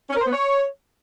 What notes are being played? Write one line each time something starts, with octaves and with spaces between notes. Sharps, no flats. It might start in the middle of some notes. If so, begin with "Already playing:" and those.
C#4
A#4
C5
B3
C#5